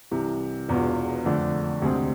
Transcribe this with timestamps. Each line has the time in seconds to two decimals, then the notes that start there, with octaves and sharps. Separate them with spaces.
0.11 C2 C3 E3
0.69 E1 E2 B2 B3 F4
1.25 F2 D3 A3 D4
1.82 D2 C3 G#3 C4 G#4